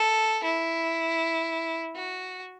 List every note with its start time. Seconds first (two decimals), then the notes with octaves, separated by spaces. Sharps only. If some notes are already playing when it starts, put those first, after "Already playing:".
Already playing: A4
0.44 E4
1.96 F#4